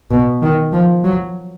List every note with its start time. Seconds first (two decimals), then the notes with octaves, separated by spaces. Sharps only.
0.11 B2
0.42 D#3
0.73 F3
1.04 F#3